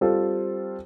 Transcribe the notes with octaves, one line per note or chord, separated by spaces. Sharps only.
G3 C4 F4 A4 C5